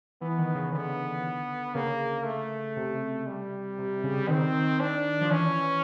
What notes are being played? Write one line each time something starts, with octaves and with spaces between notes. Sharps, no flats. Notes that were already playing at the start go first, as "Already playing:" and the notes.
E3 B3
D#3
C#3
D3 B3
C#3 A#3
A3
C3
G3
C3
C#3
D#3 C4
D4
F3
E3 C#4